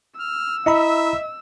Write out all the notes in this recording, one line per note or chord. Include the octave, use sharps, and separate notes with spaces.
E6 F6
E4 D#5 E5 A#5 B5